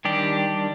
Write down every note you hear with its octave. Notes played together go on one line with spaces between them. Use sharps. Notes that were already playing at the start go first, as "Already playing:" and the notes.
D#3 G3 D4 G4